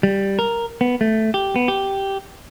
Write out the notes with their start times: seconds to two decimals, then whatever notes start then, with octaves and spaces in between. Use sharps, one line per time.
0.03 G3
0.39 A#4
0.81 B3
1.01 A3
1.34 G4
1.56 B3
1.68 G4